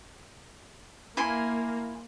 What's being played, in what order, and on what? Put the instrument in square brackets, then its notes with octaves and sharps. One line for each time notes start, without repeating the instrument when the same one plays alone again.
[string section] A#3 [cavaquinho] E4 G#5 C6